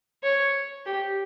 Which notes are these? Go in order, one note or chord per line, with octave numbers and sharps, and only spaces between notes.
C#5
G4